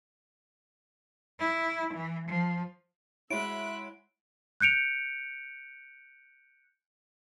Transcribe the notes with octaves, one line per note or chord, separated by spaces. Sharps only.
E4
E3
F3
G#3 E4 F#4 C#5 E5 B5 F#6 D7
F#6 G6 C#7 D7 F7